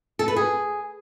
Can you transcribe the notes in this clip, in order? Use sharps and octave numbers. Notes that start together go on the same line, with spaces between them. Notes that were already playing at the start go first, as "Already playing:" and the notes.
A4
B4
G#4